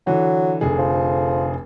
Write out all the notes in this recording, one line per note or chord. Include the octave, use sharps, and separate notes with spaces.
D3 E3 F#3
F1 D3 G#4
F3